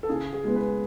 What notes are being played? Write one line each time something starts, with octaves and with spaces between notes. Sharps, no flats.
A4
C#3 G#4
G#4
G#3 B3
B4